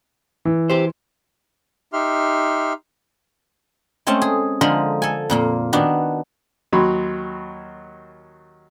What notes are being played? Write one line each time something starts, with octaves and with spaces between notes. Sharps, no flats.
E3
G4 C5
D#4 G4 E5 C6 F6
G#3 A3 C4 C#4 A5
G#4
D3 F3 G#3 A#4 B5
A4 G#5
F2 A#2 A#3
D#3 B3 D4 F#4
D#2 F#3 B5 C6